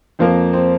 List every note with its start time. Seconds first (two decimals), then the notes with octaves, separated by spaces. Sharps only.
0.19 F2 F3 A#3
0.53 C4